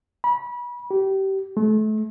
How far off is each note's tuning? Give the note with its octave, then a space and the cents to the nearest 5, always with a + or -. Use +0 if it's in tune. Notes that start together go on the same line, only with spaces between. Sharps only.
B5 -30
G4 -25
A3 -35